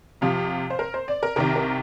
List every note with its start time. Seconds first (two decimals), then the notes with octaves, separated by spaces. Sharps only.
0.21 F2 C3 F3 F5
0.70 C5
0.79 A#4
0.94 C5
1.08 D5
1.23 A#4
1.36 C2 C3 D#3 A#4
1.56 A#4